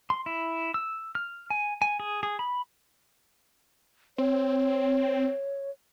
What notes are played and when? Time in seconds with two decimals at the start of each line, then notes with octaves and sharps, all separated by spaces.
0.10 C6
0.26 E4
0.74 E6
1.15 F6
1.50 G#5
1.82 G#5
2.00 G#4
2.23 G#4
2.39 B5
4.18 C4 C#5